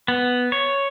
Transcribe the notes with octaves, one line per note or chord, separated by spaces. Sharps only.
B3
C#5